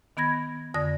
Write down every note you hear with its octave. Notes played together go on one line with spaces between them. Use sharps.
D#3 B3 B5 G#6 A#6
F2 D3 D5 D#6 A#6